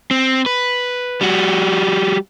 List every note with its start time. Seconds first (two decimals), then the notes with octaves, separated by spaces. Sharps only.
0.11 C4
0.46 B4
1.21 G3 F#4